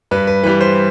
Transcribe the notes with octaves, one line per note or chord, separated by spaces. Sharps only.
G2 B4
B4
E3 G3 B4
C5